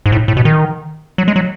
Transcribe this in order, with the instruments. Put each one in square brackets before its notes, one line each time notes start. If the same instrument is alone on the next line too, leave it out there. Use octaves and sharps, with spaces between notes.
[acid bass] G#2
A2
A2
B2
D#3
F#3
G#3
F#3